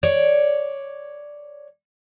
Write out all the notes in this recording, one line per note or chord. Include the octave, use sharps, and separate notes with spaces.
C#5 D5